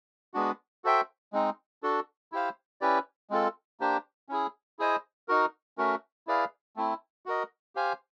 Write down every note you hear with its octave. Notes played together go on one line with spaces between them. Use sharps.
G#3 B3 D4 F#4
F#4 A4 C5 E5 G5
G#3 C4 D#4
D4 F#4 A4
E4 G4 C5 F5
C#4 E4 G4 B4 D5
G#3 C4 F4 A4
A#3 D4 G4 C5
C#4 E4 G#4
E4 G#4 C5 D#5 G#5
D#4 F#4 A#4
A3 C#4 F#4 A#4
E4 G#4 B4 D5 F5
A3 C4 E4
F#4 A#4 D#5
G4 C5 F5 G#5